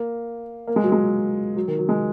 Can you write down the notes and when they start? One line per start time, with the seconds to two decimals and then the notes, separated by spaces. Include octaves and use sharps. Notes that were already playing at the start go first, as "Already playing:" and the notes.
Already playing: A#3
0.68 A#3
0.76 G#3
0.84 F#3
0.92 G#3
1.56 F#3
1.68 D#3
1.79 F#3
1.89 G#3